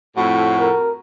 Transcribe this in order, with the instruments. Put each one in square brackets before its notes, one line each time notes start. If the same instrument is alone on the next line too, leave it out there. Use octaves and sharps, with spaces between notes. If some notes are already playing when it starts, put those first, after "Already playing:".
[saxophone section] F2 A2 [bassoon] F#4
[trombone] A#4